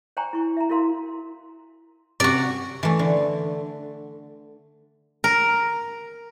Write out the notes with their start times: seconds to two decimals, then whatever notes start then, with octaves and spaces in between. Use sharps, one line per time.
0.17 C5 D5 G5 G#5 A#5 C#6
0.33 E4 C#6
0.57 E5 A#5
0.70 E4 F#4 A#4 F5 C6
2.20 C3 C#4 F#4 D5
2.83 E3 A3
2.99 D3
5.24 A#4